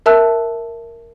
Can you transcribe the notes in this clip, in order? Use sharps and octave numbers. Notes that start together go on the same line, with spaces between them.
A#4 E5 A5 E6 F#6